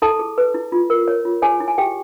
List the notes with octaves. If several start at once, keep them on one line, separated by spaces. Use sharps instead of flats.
E4 A4 A5
G#4
B4
E4
F4
A#4
C#5
F4
G#4 C#5 G#5
E4
G#5
G4 G#4 G5